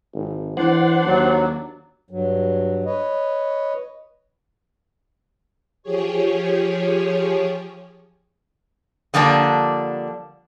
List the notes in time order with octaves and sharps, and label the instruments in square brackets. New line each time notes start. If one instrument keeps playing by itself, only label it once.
[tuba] G#1
[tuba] E3 [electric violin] D4 [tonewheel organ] C5 F#5
[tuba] D#2 [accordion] F#3
[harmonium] G2 F#3
B4 C#5 D#5
[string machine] F3 G4 G#4 C#5
[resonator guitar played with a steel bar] D3 F3 G3 A#3 D4